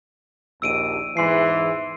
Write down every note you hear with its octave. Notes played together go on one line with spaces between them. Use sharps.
A#1 D#2 E6 D7 D#7
E2 G#2 E3 C6 C7